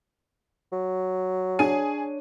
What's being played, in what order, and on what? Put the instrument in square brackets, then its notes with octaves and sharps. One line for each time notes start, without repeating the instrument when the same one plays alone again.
[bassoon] F#3
[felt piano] D4 C#5 D#7 [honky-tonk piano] G#4